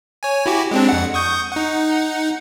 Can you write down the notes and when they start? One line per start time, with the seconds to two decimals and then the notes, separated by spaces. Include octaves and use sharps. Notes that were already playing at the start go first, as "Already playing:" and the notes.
0.23 C#5 G#5
0.46 E4 F#4 G4
0.71 G#3 C4 D4
0.89 F2 F#5
1.14 C#6 D#6 G6
1.52 D#4 F#5